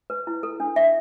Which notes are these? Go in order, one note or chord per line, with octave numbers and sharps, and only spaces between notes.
B4
E4
A4
D4
E5